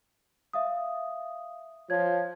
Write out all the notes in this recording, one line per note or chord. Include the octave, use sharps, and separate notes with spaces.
E5 F5 D#6
F3 C#5 G#6